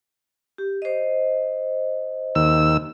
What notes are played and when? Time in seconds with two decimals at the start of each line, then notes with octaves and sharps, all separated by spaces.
0.58 G4
0.82 C5 D#5
2.35 D#2 E6